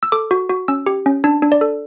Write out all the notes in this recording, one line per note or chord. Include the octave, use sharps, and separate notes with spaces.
E6
A4 D6
F#4
F#4
C#4 E6
G4
C#4
D4 A5
D4
D5
A4